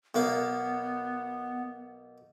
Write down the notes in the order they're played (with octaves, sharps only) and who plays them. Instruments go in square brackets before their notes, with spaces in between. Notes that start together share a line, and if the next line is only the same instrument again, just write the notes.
[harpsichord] B1 A#3 F5 [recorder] B3